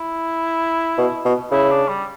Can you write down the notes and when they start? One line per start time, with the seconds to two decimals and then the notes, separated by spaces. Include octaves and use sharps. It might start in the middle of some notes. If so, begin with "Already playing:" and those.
Already playing: E4
0.98 B2
1.25 B2
1.52 C#3 E4
1.71 D4
1.89 G3